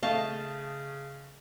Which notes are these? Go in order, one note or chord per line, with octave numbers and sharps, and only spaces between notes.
C#3 A3 D#5 F5 A5 C#6